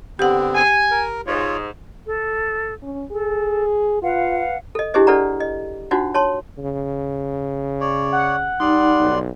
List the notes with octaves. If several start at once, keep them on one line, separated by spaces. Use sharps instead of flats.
D3 B3 C4 G4 F#5
G#5
A#4
G#2 F4 C#5
A4
C#4
G#4 A4
F4 B4 F5 F#5
A4 D#5
D4 E4 G4 G#4 C5 D#5
D4 A4 B4 D5 F#5 A#5
D#5
D4 D#4 F4 F#4 C5 F#5
C#5 A5 C6
C#3
C#5 D5
F#5
G3 D#4 D5 C6
B1